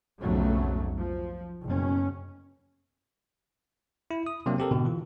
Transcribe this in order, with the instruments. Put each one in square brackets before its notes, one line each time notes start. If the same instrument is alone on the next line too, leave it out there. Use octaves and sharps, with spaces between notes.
[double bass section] B1 F2 G#2 C#3 F#3 A3
F3
F#1 B2 C#4
[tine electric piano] E4
D#6
C3 F#3 A#3 D4 G4
C4 G4 A4 A#4
G#2 B2 D3
E3 F4